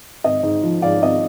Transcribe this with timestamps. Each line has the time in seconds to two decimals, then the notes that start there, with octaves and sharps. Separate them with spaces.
0.24 G#1 D#5
0.43 G#2
0.63 F3
0.82 G#2 D5 F5
1.01 G#1 D#5